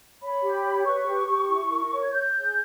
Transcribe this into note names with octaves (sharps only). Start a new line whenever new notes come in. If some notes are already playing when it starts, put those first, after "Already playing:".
C#5 B5
G4
C#5
B4 C#6
G4
G4
E4
A#4
C#5
G#6
C#5 G6
G#4